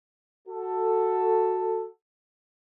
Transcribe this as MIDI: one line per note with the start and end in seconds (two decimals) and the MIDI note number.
0.48 1.87 66
0.48 1.87 69